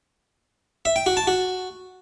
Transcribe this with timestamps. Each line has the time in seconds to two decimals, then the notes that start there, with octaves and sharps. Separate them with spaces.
0.85 E5
0.96 G5
1.06 F#4
1.17 A5
1.27 F#4